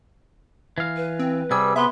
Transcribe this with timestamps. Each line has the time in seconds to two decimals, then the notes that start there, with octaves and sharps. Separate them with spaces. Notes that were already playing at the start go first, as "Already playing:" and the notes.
0.78 E3 F5
0.96 B4
1.19 C4
1.51 C3 G3 G#4 E6
1.76 B3 E5 C6